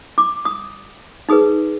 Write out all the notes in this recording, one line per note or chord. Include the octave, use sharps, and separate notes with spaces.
D6
D#6
D#4 G#4 B4 D#6